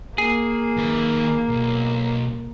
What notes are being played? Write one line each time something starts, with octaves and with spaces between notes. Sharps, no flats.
A#3 G#4
D#3 B4
B1